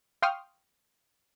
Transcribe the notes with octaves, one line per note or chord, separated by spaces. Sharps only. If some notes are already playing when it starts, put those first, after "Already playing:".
F5 G5 C6 C#6 D#6 F6